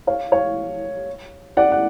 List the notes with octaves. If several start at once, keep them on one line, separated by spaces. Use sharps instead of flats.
C#5 F5
C#5 F5
D5 F#5
F#5